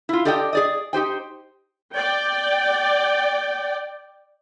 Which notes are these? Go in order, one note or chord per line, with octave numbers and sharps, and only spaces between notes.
E4 F4
G4 A4 D5 D#5 F#5 G5
G#4 D5 D#5
D#4 G4 C5 G5
D5 G5